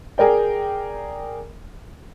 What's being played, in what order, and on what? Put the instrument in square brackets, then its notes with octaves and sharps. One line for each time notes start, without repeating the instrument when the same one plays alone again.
[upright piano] G#4 A#4 D5 G5